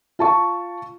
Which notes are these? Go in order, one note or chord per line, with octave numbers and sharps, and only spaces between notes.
F4 A5 C#6